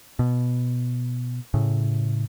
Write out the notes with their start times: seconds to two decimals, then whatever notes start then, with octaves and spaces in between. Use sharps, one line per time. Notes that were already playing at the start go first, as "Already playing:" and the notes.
0.19 B2
1.54 A2 C#3